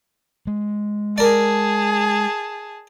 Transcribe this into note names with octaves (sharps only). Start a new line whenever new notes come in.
G#3
G#4 A#4 D5 A5